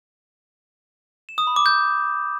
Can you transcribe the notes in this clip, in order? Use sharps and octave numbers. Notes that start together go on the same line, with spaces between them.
E7
D#6
B5
D6
G6